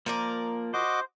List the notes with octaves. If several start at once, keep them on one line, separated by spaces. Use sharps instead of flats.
F3 A#3 A#4 D5
F#4 C5 D#5 D6